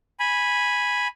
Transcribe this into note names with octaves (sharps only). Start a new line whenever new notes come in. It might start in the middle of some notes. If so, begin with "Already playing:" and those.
G#5 B5